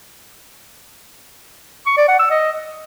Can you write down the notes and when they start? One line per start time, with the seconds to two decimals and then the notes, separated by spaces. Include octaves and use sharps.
1.86 C#6
1.97 D5
2.08 F#5
2.19 E6
2.30 D#5